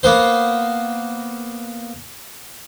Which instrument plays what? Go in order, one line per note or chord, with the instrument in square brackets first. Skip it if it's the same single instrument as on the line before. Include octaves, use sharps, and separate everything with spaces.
[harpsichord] A#3 B3 C5